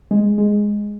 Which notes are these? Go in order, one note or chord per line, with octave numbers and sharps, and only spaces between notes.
G#3
G#3